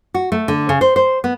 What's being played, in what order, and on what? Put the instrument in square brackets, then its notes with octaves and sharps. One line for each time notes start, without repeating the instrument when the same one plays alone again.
[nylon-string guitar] F#4
A3
D3
C#3
C5
C5
B3